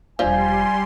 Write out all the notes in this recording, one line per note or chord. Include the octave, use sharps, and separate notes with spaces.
E1 F3 G3 D4 F4 G#5 C6